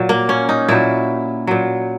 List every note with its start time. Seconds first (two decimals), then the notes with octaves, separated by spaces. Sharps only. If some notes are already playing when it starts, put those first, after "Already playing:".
Already playing: A#2 F#3
0.09 A#3
0.29 C#4
0.49 D#4
0.69 A#2 F#3 E4
1.47 A#2 F#3